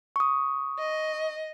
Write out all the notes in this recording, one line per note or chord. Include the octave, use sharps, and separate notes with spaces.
C#6 D#6
D#5